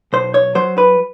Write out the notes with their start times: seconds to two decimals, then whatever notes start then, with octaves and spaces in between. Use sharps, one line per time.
0.13 B1 C5
0.34 C#5
0.55 F#3 C5
0.78 B4